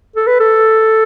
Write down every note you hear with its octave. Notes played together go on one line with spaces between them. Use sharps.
A4
B4
A4